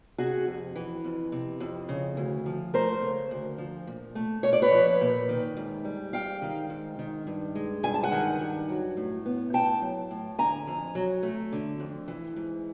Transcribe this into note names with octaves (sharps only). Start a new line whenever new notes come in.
C3 F#4 G#4
F2
E3
F2
C3
F2
C#3
D2
F3
A3 A#4 C5
C#3
D2
F3
A#2
A3
A#2 C#5
D5
B4 C#5
F3
A#2
D#3
G#2
G3
G#2 F5 G5
D#3
G#2
D#3
G2
G#3
G2 G#5
A5
F#5 G#5
D#3
G2
F#3
A2
B3
A2 G5 A5
F#3
A2
D3 G#5 A#5
F2
F#3
A3
D3
F2
E3
G#2